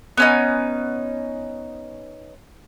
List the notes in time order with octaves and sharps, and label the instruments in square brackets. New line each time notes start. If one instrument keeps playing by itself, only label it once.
[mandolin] B3 C#4 D#4